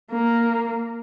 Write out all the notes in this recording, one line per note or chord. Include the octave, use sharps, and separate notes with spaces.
A#3